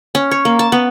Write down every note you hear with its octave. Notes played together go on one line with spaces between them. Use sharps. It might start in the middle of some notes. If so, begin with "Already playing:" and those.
C#4
C#5
A#3
A5
B3